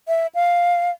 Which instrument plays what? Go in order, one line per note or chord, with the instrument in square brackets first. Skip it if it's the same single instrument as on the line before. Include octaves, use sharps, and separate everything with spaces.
[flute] E5
F5